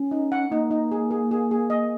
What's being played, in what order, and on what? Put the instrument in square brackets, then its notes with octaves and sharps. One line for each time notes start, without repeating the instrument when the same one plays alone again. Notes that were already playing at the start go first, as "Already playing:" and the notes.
Already playing: [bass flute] C#4
[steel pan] D#4
F#5
[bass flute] A#3 [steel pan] D#4
[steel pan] D#4
G#4
G#4
G#4
G#4
D#5